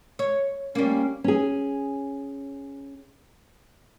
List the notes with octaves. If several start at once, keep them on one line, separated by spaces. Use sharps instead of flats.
C#5
G3 A#3 C#4
C#4 G#4